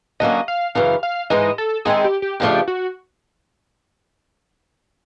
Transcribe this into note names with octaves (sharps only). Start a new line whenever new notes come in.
D3 F#3 A#3 C#4 D#5
F5
F#2 C#3 E3 F5
F5
G#2 E3 G#3 D#5
A4
D#3 G#3 C4 E4 G#4
G4
G4
F2 C#3 F3 A3 D4 G4
F#4